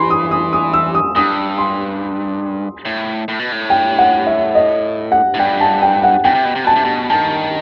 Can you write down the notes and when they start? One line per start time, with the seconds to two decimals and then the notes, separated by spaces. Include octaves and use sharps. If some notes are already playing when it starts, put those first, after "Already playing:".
Already playing: E3 B5 C6
0.10 D#6
0.31 D#6
0.53 D#6
0.73 E6
0.95 D#6
1.15 G2 D#6
1.58 C6
2.85 A2
3.28 A2
3.39 B2
3.52 A2
3.70 G5
3.99 F#5
4.27 E5
4.55 D#5
5.12 F#5
5.34 A2
5.39 G2 G5
5.61 A5
5.82 G5
6.04 F#5
6.24 B2 G5
6.35 C3
6.45 B2
6.55 C3
6.64 B2 A5
6.76 C3
6.85 B2
7.10 D#3 A5